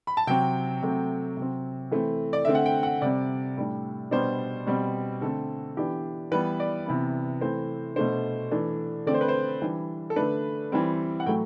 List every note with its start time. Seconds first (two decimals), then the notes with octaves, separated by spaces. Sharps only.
0.07 B5
0.17 A5
0.27 C3 F#3 C4 G5
0.82 C3 F#3 A3 C4
1.37 C3 F#3 C4
1.91 E3 A3 C4
2.33 D5
2.45 D3 A3 C4 E5
2.55 F#5
2.66 G5
2.83 F#5
3.01 C3 G3 C4 D5
3.57 A2 G3 D4
4.11 B2 G3 B3 D4 C5
4.67 B2 G3 C4
5.21 D3 A3 C4 A4
5.77 E3 B3 D4 G4
6.32 E3 G3 B3 B4
6.60 D5
6.86 C3 E3 B3
7.41 E3 A3 C4 C5
7.96 B2 A3 D4 C5
8.51 E3 A3 D4
9.06 D3 A3 C4 D5
9.14 C5
9.21 B4
9.28 C5
9.61 E3 G3 D4
10.10 A4
10.16 D3 A3 D4 B4
10.72 E3 G3 C4
11.20 F#5
11.26 A2 F#3 A3 G5